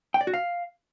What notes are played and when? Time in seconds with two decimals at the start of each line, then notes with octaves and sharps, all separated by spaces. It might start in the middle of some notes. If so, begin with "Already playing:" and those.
0.14 G5
0.21 D5
0.27 F#4
0.34 F5